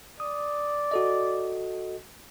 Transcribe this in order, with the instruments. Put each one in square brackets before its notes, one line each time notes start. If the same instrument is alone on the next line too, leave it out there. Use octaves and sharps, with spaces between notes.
[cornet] D5 [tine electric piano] D#6
[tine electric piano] F#4 A4 D#5